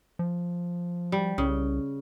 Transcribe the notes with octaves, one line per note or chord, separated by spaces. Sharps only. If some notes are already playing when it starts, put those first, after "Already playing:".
F3
G3
C2 C#3